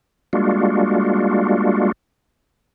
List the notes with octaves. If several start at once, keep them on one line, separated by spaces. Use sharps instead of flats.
G3 G#3 A#3 D4 F4 F#4